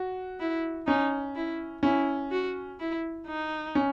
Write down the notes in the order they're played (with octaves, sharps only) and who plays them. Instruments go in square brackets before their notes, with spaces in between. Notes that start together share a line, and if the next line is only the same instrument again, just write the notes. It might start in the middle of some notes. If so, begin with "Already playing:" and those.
Already playing: [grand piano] F#4
[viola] E4
[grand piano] C#4 [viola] D#4
[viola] E4
[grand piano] C#4 [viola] E4
[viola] F#4
E4
D#4
[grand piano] C#4